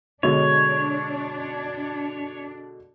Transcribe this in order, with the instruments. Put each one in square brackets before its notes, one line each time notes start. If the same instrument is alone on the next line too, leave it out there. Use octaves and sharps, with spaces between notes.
[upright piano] B2 D3 G#3 [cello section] D4 [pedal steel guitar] C#5